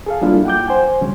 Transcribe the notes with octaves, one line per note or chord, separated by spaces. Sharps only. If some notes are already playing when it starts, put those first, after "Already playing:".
G#4 A4 F5
F#3 G3 A#3 D4 E4 F4
F#5 G5 D6 G6
C5 G#5
C#3 F#3 G3 C#4